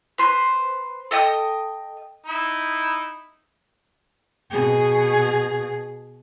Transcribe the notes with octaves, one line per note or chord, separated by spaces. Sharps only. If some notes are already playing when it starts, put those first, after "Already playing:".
B4 C5
A4 D#5 G5 D#6
D#4 E4 B5
B2 G#4